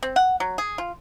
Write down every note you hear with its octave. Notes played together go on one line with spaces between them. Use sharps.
C4
F#5
F#3
G#4
F4